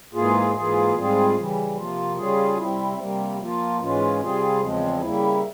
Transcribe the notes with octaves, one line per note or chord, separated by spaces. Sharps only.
G#2 E3 A#3 F4 G#4
G#2 E3 A#3 F4 G#4
G#2 G3 C4 F4 G#4
C#3 E3 G3
C3 F3 A#3 F4
C#3 G3 C#4 F4 G#4
C3 G3 C4 E4
C3 G3 A#3
F3 A#3 F4
G#2 E3 G#3 C#4 F4
C3 G3 C4 F4 G#4
E2 C#3 F3 G#3 C4
C#3 G3 A#3 E4